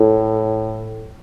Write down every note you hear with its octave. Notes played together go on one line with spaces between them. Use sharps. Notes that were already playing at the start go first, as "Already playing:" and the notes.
Already playing: A2